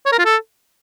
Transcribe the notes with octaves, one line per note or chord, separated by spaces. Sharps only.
C#5
A#4
F4
A4